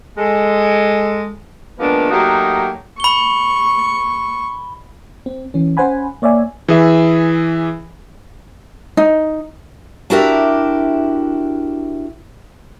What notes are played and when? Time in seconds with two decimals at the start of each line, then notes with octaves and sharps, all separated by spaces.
0.18 G#3 A4
1.80 D#3 F3 G#3 A#3 B3 D4
2.11 F#3 A3 A#3 D#4 F#4 G4
3.00 B5 C#6 G7
5.26 C4
5.54 E3 C#4
5.77 C#4 C5 F#5 G#5 B5
6.22 A#3 C#5 D5 E5 G#5
6.69 E3 G#4 E5
8.97 D#4
10.10 D4 E4 F#4 G4 A#4 E5